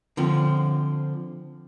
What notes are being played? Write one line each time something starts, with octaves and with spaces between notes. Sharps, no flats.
D3 F3 C4